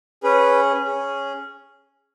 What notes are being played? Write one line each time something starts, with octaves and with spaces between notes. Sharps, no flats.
C#4 G#4 B4
C#4 G#4